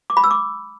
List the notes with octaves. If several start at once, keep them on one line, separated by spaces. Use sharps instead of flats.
D6
B5
E6
D6